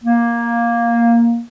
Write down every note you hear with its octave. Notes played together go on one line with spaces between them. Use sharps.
A#3